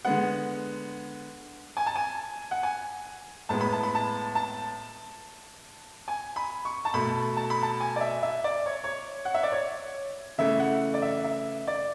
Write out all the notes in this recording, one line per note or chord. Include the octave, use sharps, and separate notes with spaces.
D3 G#3 B3 F#5
G#5
A5
G#5
F#5
G#5
A2 G#3 B3 A5
B5
A5
B5
A5
A5
G#5
B5
C#6
A5
B2 A3 B5
A5
B5
A5
G#5
D5
E5
E5
D5
C#5
C#5
F#5
E5
D5
C#5
C#3 E3 A3 E5
F#5
D5
E5
E5
D5